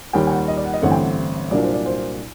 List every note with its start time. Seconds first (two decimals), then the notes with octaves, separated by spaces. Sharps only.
0.13 D#2 D#3 G3 G5
0.27 G5
0.31 F#5
0.48 D#5
0.57 D5
0.65 F#5
0.74 D#5
0.82 A1 G2 D3 A3 C4 F#5
0.91 G5
1.00 F#5
1.51 C2 A#2 F#3 A#3 D4 D5
1.63 C5
1.74 D5
1.86 C5